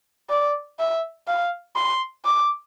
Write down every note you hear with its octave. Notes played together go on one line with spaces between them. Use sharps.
D5
E5
F5
C6
D6